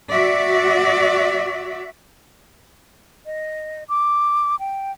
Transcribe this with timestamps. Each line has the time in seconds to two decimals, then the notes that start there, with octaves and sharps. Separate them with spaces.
0.12 F#4 D5 E5
3.26 D#5
3.89 D6
4.59 G5